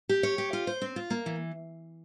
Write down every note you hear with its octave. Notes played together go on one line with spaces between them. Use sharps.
G4
C#5
G4
F4
C5
C4
F4
A#3
E3